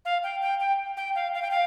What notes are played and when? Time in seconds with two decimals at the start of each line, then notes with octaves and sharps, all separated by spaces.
0.05 F5
0.23 G5
0.42 G5
0.60 G5
0.97 G5
1.15 F5
1.34 F5
1.42 G5
1.51 F5